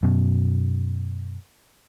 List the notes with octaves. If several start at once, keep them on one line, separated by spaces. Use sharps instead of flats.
F#2 B2